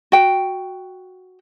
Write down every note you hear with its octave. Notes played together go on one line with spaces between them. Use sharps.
F#4 G5